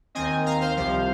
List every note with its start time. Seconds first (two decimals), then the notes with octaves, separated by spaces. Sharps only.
0.15 D#2 D#3 C4 D#5 G#5
0.46 F5 A#5
0.61 C5 F5
0.77 C2 C3 F3 C5 F5